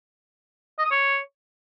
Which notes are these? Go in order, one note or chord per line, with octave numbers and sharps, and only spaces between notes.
D#5
D#6
C#5